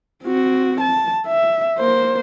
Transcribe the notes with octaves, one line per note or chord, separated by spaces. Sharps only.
C4 F#4
A5
E5
A#3 C5